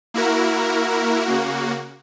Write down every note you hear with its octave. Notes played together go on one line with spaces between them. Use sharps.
A#3 E4 F#4 A#4
C#3 A#3 F#4